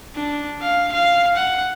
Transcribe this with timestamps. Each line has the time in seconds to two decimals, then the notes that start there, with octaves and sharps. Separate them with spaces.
0.16 D4
0.62 F5
0.92 F5
1.36 F#5